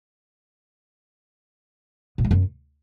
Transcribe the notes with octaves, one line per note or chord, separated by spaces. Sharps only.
A#2
G3
F#2